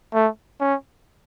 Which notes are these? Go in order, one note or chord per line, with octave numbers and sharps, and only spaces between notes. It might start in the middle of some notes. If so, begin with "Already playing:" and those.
A3
C#4